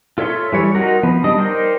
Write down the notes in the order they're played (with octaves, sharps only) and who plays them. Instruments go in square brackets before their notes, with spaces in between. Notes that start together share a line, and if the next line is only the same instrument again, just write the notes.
[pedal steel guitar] F4 A4 C#5 E5 C6
E3 G3 C#5
D#4 F4 F#4 A#4
F3 B3
G3 D4 D#5 D#6
D#4 A#4 C5 D5 G5